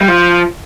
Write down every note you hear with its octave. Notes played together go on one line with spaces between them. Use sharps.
G3
F3